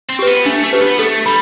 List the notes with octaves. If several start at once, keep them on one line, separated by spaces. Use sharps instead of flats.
C4
G4 B4
B3
A3 D4
A3
G4 B4
B3
A3 A4
G3 B5